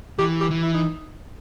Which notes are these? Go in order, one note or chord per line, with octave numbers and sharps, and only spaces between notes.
E3 G4
G4
E3
E4
D#4